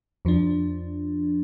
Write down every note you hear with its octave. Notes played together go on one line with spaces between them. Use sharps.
F2 F3 D4